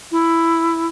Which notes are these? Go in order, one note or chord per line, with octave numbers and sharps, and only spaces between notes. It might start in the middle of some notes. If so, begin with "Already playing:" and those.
E4